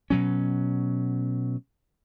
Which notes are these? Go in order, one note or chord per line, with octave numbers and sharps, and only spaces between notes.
B2 F#3 C#4